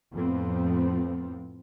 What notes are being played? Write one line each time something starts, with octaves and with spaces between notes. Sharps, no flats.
F2 A2 F3 B3 C4